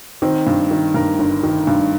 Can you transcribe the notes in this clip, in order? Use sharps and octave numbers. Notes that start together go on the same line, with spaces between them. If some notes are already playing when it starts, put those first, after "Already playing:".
D#3 C4
G2
D#3
G2 A#4
G1
D#3
G2